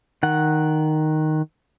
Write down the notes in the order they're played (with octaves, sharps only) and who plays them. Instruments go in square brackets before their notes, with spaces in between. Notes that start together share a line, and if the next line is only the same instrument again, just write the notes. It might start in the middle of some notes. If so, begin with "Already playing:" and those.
[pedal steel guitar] D#3 F#5